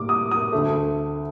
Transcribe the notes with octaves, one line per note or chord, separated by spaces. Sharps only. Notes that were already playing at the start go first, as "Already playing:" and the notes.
Already playing: A2 G3 A#3 D#4 D6
D#6
D#6
D2 D3 A3